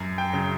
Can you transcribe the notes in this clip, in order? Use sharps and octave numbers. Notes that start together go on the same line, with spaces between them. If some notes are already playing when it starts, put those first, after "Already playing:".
Already playing: F#2
G5
C#3 F#3